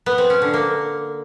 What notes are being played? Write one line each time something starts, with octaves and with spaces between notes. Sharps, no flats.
B3
C4
C#4
D3
A#3